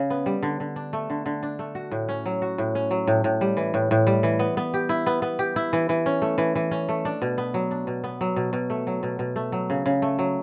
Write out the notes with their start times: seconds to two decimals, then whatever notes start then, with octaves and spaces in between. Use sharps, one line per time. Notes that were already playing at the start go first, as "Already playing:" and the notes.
Already playing: C#3
0.10 B3
0.26 G3
0.43 D3
0.60 D3
0.76 D4
0.93 A3
1.10 D3
1.26 D3
1.43 D4
1.59 A3
1.75 F#4
1.91 A2
2.09 C#4
2.26 F#3
2.42 F#4
2.58 A2
2.75 C#4
2.91 F#3
3.08 A2
3.24 A2
3.41 G3
3.57 E3
3.74 A2
3.91 A2
4.07 G3
4.23 E3
4.39 B3
4.57 B3
4.74 G4
4.89 E4
5.06 B3
5.22 B3
5.39 G4
5.56 E4
5.73 E3
5.89 E3
6.06 C#4
6.22 A3
6.38 E3
6.55 E3
6.71 C#4
6.89 A3
7.05 D4
7.22 B2
7.38 B3
7.54 F#3
7.71 D4
7.87 B2
8.04 B3
8.21 F#3
8.36 B2
8.53 B2
8.70 A3
8.87 F#3
9.03 B2
9.19 B2
9.36 A3
9.52 F#3
9.70 C#3
9.86 C#3
10.02 A3
10.19 F#3